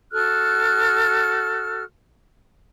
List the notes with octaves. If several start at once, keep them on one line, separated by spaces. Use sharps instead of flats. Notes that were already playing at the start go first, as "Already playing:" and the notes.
F#4 A4 F6 F#6